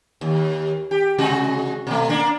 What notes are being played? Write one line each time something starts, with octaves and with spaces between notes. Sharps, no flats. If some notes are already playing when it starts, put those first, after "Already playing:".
D#2
G4
C3 G#3 F#4
B2 A3
A#3 D4